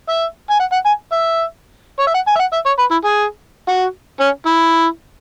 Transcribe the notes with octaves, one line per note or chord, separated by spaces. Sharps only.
E5
G#5
F#5
F#5
G#5
E5
C#5
E5
F#5
G#5
E5
F#5
E5
C#5
B4
E4
G#4
F#4
C#4
E4